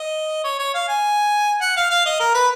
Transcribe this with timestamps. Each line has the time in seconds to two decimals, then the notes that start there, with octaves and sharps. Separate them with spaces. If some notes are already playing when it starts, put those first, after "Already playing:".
Already playing: D#5
0.44 C#5
0.59 C#5
0.74 F5
0.88 G#5
1.62 F#5
1.77 F5
1.90 F5
2.06 D#5
2.20 A#4
2.34 B4